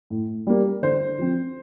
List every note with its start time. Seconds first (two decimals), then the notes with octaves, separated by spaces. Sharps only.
0.10 A2
0.47 G3 A#3
0.83 D3 C5
1.19 F3 C4